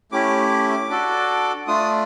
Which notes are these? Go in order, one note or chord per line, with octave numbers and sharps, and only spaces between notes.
A3 C#4 E4 G4 D6
D4 F#4 A4
A3 D4 F4 D#6